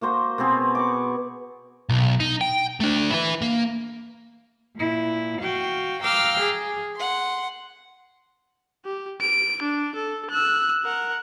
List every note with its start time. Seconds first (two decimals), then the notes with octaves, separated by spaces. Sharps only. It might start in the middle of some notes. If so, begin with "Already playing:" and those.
0.01 A#3 F#4 C5 A#5
0.38 B2 B3 C4 G#4
0.75 C#6 D6
1.89 B1
2.20 D#4
2.41 G5
2.80 A3 D4
3.10 E4 B4
3.42 A#3
4.75 A#2 E4
5.40 F#4 F5 G5
6.03 F5 G5 A#5 D6 E6 F6
6.39 G#4
6.95 F#5 C6
8.85 G4
9.21 D7
9.62 D4
9.95 A4
10.30 E6 F#6
10.84 A#4 F#5